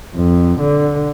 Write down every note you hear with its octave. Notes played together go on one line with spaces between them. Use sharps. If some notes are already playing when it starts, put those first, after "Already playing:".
F2
D3